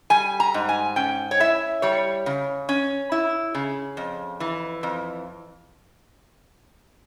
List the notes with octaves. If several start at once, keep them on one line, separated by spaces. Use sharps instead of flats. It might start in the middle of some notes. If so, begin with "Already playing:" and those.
G3 G#5
A#5
G#2
G#5
C#4 G5
C#5
E4 E5
G3 C#5
C#3
C#4
E4
C#3
F2
E3
F2